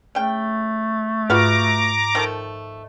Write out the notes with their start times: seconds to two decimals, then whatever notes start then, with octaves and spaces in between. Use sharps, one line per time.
0.15 C#3 A3 G5
1.30 G#2 F4 F#4 B4 F5 A#5 D6
2.15 D#3 F3 A3